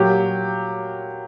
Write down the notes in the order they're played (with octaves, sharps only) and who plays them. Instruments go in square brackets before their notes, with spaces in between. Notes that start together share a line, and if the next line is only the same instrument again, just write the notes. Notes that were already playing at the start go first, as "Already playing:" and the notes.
Already playing: [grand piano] A#2 F#3 G4